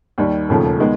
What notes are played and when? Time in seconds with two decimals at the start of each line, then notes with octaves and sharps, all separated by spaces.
0.18 D#2 D#3 G3
0.49 E1 D#2 C#3 F3 A3
0.80 D#3 G#3 B3